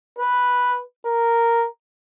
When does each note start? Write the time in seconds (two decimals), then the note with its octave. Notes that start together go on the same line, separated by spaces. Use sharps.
0.19 B4
1.06 A#4